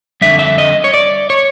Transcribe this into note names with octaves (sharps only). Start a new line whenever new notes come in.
F2 D3 G3 E5
E5
D#5
C#5
D5
C#5